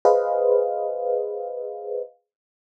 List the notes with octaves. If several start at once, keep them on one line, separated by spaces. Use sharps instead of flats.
G#4 B4 C5 D#5 F5